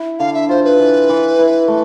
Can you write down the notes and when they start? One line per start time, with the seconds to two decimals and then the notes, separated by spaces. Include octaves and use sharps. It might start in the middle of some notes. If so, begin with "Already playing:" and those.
Already playing: E4
0.19 D3 F5
0.34 E5
0.49 F4 C5
0.64 B4
0.79 E3
1.09 E3
1.39 E4
1.68 A3